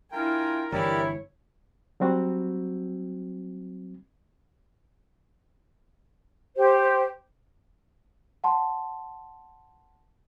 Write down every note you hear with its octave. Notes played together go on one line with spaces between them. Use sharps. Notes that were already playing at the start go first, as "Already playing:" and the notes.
D4 E4 F4 A#4 G5 G#5
G1 E3 E4 G4 A#4 C#5 D5
F#3 G3 C4 F#4
G4 C5
F#5 A5 C6